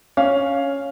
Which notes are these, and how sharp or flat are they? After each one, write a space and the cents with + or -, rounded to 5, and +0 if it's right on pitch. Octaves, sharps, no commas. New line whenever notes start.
C#4 +0 F5 +0